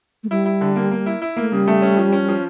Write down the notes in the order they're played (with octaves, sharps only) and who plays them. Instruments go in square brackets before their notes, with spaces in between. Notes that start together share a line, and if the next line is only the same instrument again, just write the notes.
[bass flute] A3
[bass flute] G3 [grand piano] E4
[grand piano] E4
D3
A#3
A#3
E4
E4
[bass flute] A3 [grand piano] A#3
[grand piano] C#3 [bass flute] G3
[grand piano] A3
C#4
F3
C#4
F3